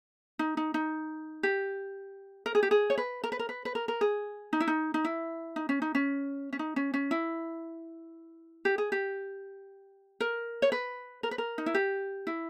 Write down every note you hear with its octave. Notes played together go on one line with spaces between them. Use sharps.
D#4
D#4
D#4
G4
A#4
G#4
G4
G#4
C#5
B4
A#4
B4
A#4
B4
B4
A#4
A#4
G#4
D#4
E4
D#4
D#4
E4
D#4
C#4
D#4
C#4
C#4
D#4
C#4
C#4
E4
G4
G#4
G4
A#4
C#5
B4
A#4
B4
A#4
D#4
E4
G4
E4